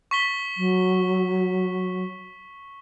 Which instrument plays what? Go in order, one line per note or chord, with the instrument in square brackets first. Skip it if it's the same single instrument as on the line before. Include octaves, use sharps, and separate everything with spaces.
[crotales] C#6 B6 G7
[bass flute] F#3